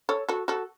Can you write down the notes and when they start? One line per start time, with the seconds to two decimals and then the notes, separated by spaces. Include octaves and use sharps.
0.09 A4 C#5
0.29 F#4 A4
0.48 F#4 A4